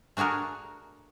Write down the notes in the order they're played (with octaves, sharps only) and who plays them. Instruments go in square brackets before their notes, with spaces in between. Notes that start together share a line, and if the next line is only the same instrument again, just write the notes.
[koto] A3 D4 F#4 G#4 A#4